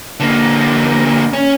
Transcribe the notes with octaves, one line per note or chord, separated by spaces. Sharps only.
D3 A#3
C#4